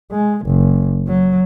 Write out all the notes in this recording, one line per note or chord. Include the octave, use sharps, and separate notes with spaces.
G#3
F#1
F#3